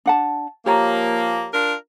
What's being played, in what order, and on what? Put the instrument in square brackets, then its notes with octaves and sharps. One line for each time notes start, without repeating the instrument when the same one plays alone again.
[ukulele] D4 F#5 A5
[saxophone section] F3 A#3 [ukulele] G4 C#5 A#5
[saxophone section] D4 F4 A#4